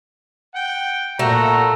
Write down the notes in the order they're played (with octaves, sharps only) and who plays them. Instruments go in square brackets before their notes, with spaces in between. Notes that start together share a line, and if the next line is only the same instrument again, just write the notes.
[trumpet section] F#5 G5
[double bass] A#2 [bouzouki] A3 [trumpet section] F#4 [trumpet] A#5